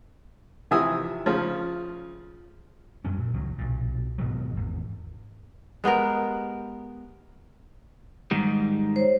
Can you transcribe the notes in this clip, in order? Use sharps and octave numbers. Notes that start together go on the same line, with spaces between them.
C3 E3 F3 E5 G#5 D#6
C#3 F3
F#2 G3 C#4
A#2
C#2 D#3 F#3
B1 A#2
G#2 B2 D#3 F#3
G#1 E2
G#3 B3 G4 A#4
G#2 D#3 G3
C5 C#5